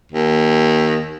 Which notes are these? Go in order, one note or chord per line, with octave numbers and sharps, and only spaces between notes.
D#2